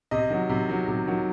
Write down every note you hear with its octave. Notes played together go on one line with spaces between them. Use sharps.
C3 D#5
D#3 F#3
C3
D#3 F#3
C3
D#3 F#3